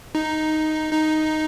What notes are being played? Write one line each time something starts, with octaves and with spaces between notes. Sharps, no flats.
D#4
D#4